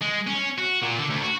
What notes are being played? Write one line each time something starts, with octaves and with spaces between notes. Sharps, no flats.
G#3
C#4
F#4
A#2
D3
D2
F#4